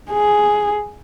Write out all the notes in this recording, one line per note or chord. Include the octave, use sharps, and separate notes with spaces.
G#4